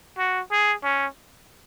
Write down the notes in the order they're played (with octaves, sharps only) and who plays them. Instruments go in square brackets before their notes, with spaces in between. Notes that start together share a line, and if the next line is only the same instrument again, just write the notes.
[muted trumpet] F#4
G#4
C#4